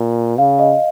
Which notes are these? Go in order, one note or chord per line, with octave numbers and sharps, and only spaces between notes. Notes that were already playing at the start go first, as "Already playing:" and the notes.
Already playing: A#2
C#3 F5
D#5